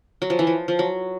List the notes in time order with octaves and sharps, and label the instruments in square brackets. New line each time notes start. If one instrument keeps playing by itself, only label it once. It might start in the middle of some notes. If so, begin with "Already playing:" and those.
[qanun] F#3
F3
E3
F3
F3
F#3